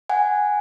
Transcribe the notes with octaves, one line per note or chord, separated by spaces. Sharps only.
F#5 G#5